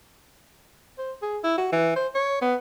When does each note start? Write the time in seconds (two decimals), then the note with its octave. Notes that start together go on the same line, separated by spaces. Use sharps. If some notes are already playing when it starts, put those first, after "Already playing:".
0.99 C5
1.22 G#4
1.44 E4
1.58 F#4
1.73 E3
1.96 C5
2.15 C#5
2.42 B3